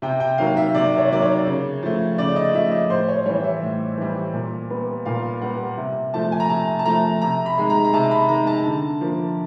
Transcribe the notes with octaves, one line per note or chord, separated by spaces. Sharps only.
C3 G5
G5
D#3 F#3 A#3 F5
E5
C3 D5
C#5
D#3 F#3 A#3 D5
C#5
C#3
F3 A3
C#3 D5
D#5
F3 A3 E5
D#5
A2 C5
C#5
E3 G3 C#5
E5
A2
E3 G3
A#2
G3 B3
A#2 F5
G3 B3 F#5
C3
F3 A3 A5
G#5
A#5
C3 A5
A5
F3 A3 A#5
C3 A#5
B5
D#3 G#3
A#5
A#5
C3 A5
B5
D#3 G#3 A#5
A5
D3
F3 A#3